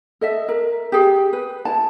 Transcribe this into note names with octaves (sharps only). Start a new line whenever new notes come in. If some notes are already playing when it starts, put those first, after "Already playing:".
A4 D#5 E5
A#4
G4 G#4
B4
E4 A5